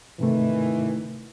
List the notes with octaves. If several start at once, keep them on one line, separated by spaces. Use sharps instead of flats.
G#2 C3 D#3 E3 A3